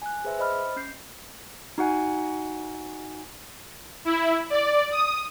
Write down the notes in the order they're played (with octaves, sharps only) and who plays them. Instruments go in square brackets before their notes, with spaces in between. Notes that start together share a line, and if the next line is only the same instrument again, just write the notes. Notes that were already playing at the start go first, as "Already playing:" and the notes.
[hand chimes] G#5 F#6
G#4 B4 C5 E5
C5 D#5 B5 F6
C#4 G6 C7
[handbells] D#4 F#4 F#5 G#5
[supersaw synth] E4
D5
D#6